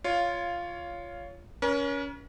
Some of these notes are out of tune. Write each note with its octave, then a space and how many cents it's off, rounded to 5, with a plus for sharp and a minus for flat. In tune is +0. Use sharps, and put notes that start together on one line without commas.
F4 -5 C#5 +15 F5 +0
C#4 +25 A#4 +45